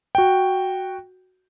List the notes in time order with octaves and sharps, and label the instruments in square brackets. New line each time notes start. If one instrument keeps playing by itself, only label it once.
[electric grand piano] F#4 G5